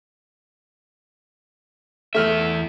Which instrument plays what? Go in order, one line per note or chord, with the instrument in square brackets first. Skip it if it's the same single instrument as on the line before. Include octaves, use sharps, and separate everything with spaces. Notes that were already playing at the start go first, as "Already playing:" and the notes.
[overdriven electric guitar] E2 E5 [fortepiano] A3 F6